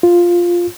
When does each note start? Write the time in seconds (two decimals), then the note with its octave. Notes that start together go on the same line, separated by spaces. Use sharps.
0.03 F4